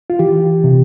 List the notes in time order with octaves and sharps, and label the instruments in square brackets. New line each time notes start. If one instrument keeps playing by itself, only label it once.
[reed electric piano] F4
E3 G4
C3